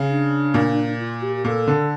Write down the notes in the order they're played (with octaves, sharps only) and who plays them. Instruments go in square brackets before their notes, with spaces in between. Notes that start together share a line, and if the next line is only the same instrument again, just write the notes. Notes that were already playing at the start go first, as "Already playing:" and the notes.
Already playing: [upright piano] C#3
[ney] D4
[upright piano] A#2
[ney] F4
G4
G4
[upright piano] A#2 [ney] A4
[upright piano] D3